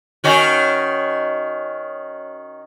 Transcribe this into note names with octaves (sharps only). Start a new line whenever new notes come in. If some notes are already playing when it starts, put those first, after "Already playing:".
D#3 C#4 F#4